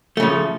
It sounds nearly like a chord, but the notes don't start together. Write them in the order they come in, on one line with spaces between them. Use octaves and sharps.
A3 C#3 F3